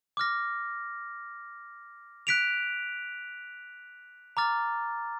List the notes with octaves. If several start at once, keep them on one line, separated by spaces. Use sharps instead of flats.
D6 F6 A#6
F#6 B6 D7 F7
A#5 D6 F6 A6